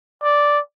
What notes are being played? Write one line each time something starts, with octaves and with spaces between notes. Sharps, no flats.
D5